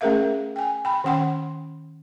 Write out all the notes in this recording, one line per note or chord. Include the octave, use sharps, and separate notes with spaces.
A3 C#4 G#4 A#4 E5 F5
G5 G#5
G5 B5
D#3 C#4 F#5 G5 C6